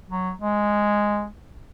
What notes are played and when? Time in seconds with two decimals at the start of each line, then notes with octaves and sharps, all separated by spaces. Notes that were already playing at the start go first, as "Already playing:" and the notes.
0.10 F#3
0.41 G#3